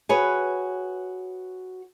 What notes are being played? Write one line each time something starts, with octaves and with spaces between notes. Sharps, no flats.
F#4 G#4 B4 C#5 G#5